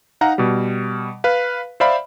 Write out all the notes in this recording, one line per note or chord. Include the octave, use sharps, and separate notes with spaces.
D#4 F5 F#5 A#5
B2 G3
B4 F5
C5 D5 E5 F5 B5